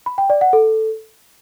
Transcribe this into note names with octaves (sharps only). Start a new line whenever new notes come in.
B5
G5
D5
F#5
A4